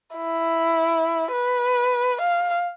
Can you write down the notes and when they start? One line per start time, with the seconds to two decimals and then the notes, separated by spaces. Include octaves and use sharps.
0.16 E4
1.32 B4
2.21 F5